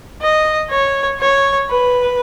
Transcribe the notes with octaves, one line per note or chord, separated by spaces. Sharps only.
D#5
C#5
C#5
B4